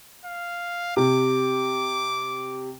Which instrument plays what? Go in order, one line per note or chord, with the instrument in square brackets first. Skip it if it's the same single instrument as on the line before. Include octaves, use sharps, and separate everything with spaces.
[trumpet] F5
[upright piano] C3 [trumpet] D6